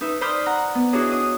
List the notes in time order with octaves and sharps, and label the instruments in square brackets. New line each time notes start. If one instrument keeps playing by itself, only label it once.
[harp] D#4 B4 E5
C5 D5 B5 D#6 F6 G6
F#5 A#5
B3
D4 E4 F#4 G#4 C#5 D#5
D#6